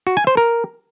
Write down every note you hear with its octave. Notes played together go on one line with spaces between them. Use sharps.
F#4
G#5
C5
A#4